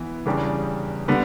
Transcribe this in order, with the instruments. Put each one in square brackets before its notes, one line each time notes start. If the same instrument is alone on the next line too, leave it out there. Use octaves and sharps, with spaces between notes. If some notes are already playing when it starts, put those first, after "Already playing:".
Already playing: [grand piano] E3 B3
E2 C#3 G3 D4 G4
D3 G3 B3